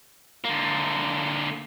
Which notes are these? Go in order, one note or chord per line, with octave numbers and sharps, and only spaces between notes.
D3 A#3